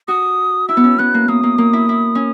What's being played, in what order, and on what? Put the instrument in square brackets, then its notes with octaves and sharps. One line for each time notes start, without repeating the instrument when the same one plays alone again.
[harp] F#4 [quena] D#6
[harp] E4 [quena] E6
[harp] B3
C#4
[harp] B3 [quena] F#6
[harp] A#3
[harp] A#3 [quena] D#6
[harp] A#3
A#3
E4
E4
C#4